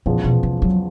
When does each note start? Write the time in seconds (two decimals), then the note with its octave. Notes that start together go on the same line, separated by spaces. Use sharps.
0.06 E2 A#2 C#3 F3 G#3 B3
0.24 B2
0.43 C3
0.62 F#3